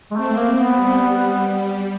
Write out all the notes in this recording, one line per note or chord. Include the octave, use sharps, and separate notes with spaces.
G#3
A3 C4
A#3
B3
G3
G3